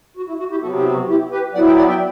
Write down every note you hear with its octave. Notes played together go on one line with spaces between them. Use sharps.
F#4
E4
F#4
E4 G4
C3 F#3 B3 F#4 A4
E4 G4
F#4
E4 G4
G4 B4
F#3 B3 E4 D5 F#5
E5 G5
D5 F#5
E5 G5